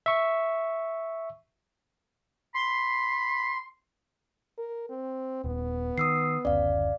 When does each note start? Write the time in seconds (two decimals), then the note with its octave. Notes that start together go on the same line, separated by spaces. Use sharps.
0.06 E5 C#6
2.54 B5 C6
4.58 A#4
4.90 C4
5.44 D#1 B3
5.98 D#3 D#6 E6 C7
6.45 F#1 D2 C#4 D5 F5